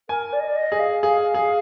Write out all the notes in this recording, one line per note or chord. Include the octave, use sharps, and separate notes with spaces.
A#4 G#5
D5
D#5
D5
D#5
G#4
F5
G#4 F5
G#4